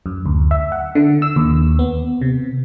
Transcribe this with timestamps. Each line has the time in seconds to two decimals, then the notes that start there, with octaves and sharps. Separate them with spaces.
0.06 F#2
0.26 D2
0.51 E5
0.72 F#5
0.95 D3
1.22 E6
1.36 D#2
1.79 B3
2.21 C3